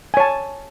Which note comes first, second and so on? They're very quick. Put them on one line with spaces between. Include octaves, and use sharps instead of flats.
G#5 C#5 A5